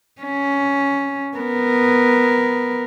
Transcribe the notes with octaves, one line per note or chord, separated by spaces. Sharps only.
C#4
B3 A#4